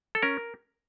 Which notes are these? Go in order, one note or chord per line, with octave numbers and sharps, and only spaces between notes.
A4
C#4 A#4